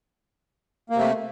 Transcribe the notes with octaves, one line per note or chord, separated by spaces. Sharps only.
C3 A3 A#3